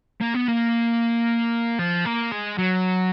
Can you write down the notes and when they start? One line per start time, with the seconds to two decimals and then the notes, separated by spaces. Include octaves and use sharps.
0.21 A#3
0.35 B3
0.48 A#3
1.79 F3
2.05 A#3
2.31 G#3
2.58 F#3